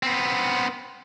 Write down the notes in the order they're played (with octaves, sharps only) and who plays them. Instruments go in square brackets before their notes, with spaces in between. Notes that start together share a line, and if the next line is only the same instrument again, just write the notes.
[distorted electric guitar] B3 C4